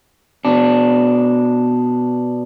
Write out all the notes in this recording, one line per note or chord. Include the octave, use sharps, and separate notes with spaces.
B2 D4